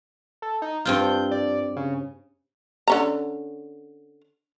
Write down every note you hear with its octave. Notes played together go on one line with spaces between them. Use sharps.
A4
D#4
G2 C4 F4 G6
D5
C#3
D3 C#4 A#5